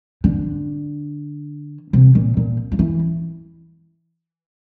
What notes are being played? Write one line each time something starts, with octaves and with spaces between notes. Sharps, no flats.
D3
C3
A#2
A#2
F3
E3